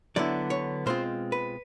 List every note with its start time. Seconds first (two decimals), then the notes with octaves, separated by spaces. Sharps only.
0.16 D3 F#3 B3 E4 D5
0.50 C#5
0.86 B2 G#3 C4 F4 C5
1.32 B4